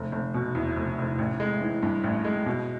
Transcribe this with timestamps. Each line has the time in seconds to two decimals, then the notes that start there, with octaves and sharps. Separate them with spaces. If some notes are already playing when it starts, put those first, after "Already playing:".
Already playing: F1
0.12 F1
0.34 B2
0.55 E2
0.76 F1
0.98 F1
1.19 A1
1.40 G#3
1.61 E3
1.83 G2
2.04 A1
2.25 G#3
2.46 B2